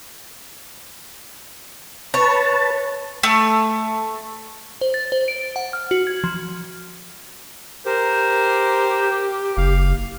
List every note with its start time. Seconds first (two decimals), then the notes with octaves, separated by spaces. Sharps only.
2.14 B4 C#5 A5
3.23 A3
4.81 C5
4.94 A6
5.12 C5
5.28 D7
5.56 F#5
5.73 F6
5.91 F#4
6.07 G#6
6.24 F3
7.86 G4 A#4 C5
9.57 F#1 F5